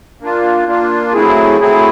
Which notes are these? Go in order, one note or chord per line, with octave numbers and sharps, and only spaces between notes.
A#3 D4 F4
A#3 D4 F4
F#3 A3 C4 E4 G#4
F#3 A3 C4 E4 G#4